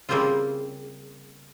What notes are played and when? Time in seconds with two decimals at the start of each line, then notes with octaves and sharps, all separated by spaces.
0.09 C#3 G3 A#3 C4 E4 F4